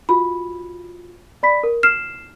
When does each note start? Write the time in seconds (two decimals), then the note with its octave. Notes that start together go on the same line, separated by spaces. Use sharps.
0.09 F4 F#4 B5
1.43 D5 B5 B6
1.63 A#4
1.83 F6 C7 E7